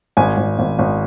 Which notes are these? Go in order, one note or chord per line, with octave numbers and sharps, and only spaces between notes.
G#1 G#5
G#1
G#1
G#1